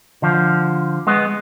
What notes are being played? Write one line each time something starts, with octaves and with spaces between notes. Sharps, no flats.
D3 F3
G#3 B3